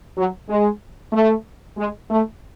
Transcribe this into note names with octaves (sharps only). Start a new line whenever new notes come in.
F#3
G#3
A3
G#3
A3